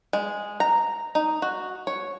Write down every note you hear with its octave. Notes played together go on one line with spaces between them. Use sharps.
G#3
A#5
D#4
F#4
C#5